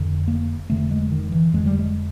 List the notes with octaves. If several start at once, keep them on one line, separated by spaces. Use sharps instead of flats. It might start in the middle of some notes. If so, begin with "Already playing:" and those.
Already playing: F1 F2 D3
A#3
F1 F2 D3 A3
G#3
D#3
E3
F1 F2 D3 G#3
G3
G#3